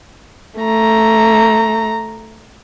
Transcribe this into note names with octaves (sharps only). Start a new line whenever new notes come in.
A3 A#5